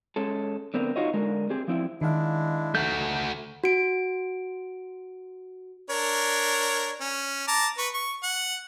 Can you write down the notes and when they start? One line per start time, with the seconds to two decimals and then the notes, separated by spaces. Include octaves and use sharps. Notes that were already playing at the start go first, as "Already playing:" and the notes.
0.16 G#3 C#4 A4
0.74 D3 B3 C4 A#4
0.96 D#4 F4 F#4 C#5 D#5
1.13 D3 G#3 A#4
1.50 C4 G4 G#4
1.68 F3 C4 E4
2.01 D#3 G#3 D4 E4 F5
2.75 A3 D#4 F#4 G6
3.64 F#4 D7
5.90 D4 A#4 C#5
7.01 C#4
7.48 A5 A#5 D6
7.78 B4 C#6
7.94 C#6
8.23 F#5